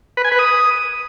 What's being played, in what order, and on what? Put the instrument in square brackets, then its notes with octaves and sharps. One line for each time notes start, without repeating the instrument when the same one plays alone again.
[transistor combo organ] B4
G#5
B4
D#6